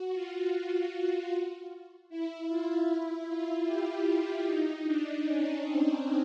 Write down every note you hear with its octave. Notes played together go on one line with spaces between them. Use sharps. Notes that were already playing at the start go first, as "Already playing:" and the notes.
Already playing: F#4
F4
E4
F4
E4
F4
G4
F4
D#4
D4
C#4
C4